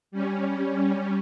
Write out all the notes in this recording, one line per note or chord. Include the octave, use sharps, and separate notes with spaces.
G3 C#4